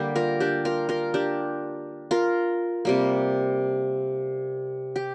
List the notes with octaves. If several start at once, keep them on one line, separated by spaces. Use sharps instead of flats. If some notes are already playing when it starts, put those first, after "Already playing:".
Already playing: D3 G3 A#3 G4
F4 A#4
D4 G4
F4 A#4
F4 A#4
D4 G4
F4 A#4
C3 G3 A#3
G4